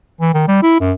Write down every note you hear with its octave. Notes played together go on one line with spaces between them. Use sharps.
E3
D#3
G3
E4
F#2